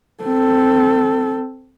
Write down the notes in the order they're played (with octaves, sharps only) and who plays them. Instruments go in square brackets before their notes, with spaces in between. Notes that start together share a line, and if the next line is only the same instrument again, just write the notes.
[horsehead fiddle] C4 A4